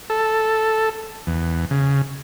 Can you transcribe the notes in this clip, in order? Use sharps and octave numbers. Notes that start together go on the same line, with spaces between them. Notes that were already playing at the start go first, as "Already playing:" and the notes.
A4
E2
C#3